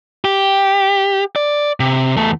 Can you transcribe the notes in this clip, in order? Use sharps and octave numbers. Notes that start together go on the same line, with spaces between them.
G4
D5
C3
E2 A3